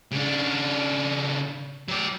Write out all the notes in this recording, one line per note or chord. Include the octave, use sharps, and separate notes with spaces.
C#3 D4
F#3 D5